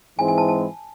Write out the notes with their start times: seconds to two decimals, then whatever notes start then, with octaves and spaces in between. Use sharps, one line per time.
0.17 G#2 E3 G#3 C4 E4 G#5
0.28 G#5
0.38 A5
0.48 A5